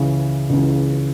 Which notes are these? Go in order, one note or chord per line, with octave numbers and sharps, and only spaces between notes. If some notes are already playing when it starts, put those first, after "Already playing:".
Already playing: C#2 C#3 E3
C#2 C#3 E3